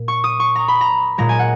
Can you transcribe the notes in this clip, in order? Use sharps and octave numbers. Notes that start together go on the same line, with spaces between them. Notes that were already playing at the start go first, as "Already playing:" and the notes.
Already playing: A#2
C#6
D#6
C#6
A#5
B5
A#5
A#2 G#3 A#5
G#5
F#5